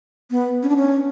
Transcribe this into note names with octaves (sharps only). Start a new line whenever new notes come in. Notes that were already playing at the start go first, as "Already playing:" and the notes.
B3
C#4
D4
C#4